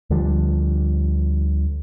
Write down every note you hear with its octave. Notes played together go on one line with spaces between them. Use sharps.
D2 D3 F3 G3